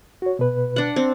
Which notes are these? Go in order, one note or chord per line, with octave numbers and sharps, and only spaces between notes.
F#4 C#5
B2 B4
D4 F#5
C4